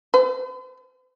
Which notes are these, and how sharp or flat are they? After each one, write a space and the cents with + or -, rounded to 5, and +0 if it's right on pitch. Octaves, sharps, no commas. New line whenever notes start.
C5 -45